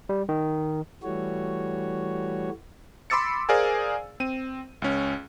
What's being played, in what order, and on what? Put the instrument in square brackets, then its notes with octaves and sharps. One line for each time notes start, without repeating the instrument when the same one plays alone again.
[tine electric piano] G3
D#3
[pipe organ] E3 G3 A3 F#4 C#5
[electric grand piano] B5 C6 D6 E6 A6 C#7
G#4 A#4 C5 D5 F5 G#5
C4 D#7
C#2 C#4